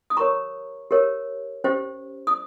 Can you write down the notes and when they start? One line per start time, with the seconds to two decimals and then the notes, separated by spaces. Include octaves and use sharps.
0.10 D#6
0.17 G4 A#4 C#5 A#5 C#6
0.91 G4 A#4 C#5
1.64 C#4 G4 C5
2.27 D#6